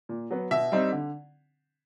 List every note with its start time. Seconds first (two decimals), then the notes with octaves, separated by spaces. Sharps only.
0.09 A#2
0.31 F#3 B3
0.51 B2 E5
0.72 G3 C4 D#4
0.92 D3